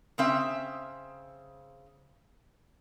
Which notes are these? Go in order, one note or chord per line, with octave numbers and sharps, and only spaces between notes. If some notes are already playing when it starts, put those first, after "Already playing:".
C#3 C4 E5